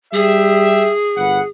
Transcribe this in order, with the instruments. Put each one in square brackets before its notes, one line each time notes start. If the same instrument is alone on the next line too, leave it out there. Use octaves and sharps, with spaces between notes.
[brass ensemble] G3 G4 E5 [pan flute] G#4
[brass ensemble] G1 B4 F#5